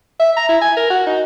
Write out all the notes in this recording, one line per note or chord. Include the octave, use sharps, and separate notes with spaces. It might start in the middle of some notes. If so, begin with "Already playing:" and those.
E5
A#5
E4
G#5
A#4
F#4
D#4